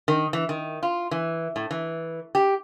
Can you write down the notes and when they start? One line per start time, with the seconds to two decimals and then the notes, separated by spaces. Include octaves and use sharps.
0.08 D#3
0.33 E3
0.49 D#3
0.83 F4
1.11 E3
1.56 A2
1.71 E3
2.35 G4